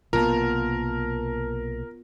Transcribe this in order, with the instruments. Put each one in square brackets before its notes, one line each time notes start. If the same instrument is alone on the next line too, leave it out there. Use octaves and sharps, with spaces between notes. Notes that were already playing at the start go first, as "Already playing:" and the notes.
[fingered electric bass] B1 C3 A#3 [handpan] B3 F4 [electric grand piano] A#4 [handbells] A5 A#5